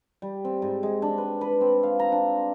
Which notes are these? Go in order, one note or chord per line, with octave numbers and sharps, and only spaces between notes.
G3
C4
G#2
G#3
D4
B4
B4
C4
F5
A#5
D4